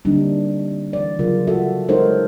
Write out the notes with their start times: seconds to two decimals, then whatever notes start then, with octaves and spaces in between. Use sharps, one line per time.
0.05 D3 G3 A#3 C4 D4 D#4
0.93 E3 D5
1.19 C#3 F#3 F4 A#4
1.47 F4 F#4 A4 E5
1.88 G#3 D#4 A4 A#4 C5 C#5